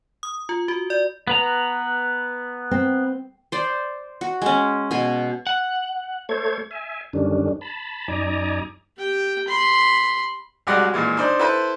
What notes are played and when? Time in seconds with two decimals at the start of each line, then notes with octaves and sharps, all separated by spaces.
0.23 D#6
0.49 F4
0.68 F#4
0.90 D5
1.28 B3 B4 A#5
2.71 C4
3.52 C5 D5
4.21 F#4
4.42 G#3 C#4
4.91 B2 G#5
5.47 F#5
6.29 A3 A4 C5 C#5 G#6
6.71 E5 G#5
7.13 F#2 D3 D#3 G3 C#4 D4
7.61 A5 B5
8.08 F#2 D#4 D5 G#5 A#5
8.97 G4 G5
9.48 B5 C6
10.67 C2 F#3 G#3 G4 D5 F#5
10.94 G#1 A#2 E3 G#3
11.17 D4 D#4 C5
11.39 E4 A4 B4 C5